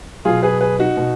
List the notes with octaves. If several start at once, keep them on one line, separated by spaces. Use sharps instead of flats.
B2 F#3 F4 G#4
G#4 B4
G#4 B4
D#4 F#4
B2